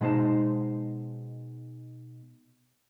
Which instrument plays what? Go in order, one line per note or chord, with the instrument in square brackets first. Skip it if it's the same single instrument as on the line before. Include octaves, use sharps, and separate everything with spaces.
[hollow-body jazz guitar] B2 G#3 D#4 C5 A5